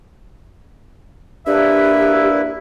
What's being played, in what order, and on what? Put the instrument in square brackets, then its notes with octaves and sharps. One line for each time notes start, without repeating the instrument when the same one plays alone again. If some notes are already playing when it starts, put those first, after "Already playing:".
[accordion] A#3 E4 B4 [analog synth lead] D4 [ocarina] G4 [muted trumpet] E5